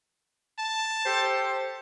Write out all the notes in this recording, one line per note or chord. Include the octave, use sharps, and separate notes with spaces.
A5
G4 A4 C5